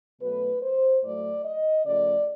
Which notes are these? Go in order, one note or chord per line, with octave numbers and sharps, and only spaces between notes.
B2 F#3 A3 B4
C5
A2 F#3 A3 D5
D#5
C#3 F3 A3 D5